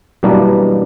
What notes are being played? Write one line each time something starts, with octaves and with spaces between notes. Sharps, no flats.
F#2 B2 E3 G3 A#3 D4